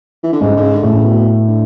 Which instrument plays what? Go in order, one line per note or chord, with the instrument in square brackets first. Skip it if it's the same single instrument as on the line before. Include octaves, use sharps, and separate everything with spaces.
[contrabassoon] E3
D3
[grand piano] G#2 G#3 [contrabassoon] C#3
[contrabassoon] D3
C#3
D3
[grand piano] A2 A3 [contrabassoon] C#3
[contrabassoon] B2
D3